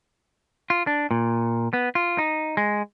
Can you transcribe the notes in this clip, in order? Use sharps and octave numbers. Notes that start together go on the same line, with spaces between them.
F4
D4
A#2
B3
F4
D#4
G#3